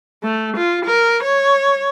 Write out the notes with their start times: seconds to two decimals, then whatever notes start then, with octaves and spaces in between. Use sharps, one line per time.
0.23 A3
0.56 F4
0.85 A#4
1.23 C#5